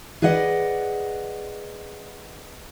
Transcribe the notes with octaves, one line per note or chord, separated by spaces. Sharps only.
G#4 B4 D5 D#5 F#5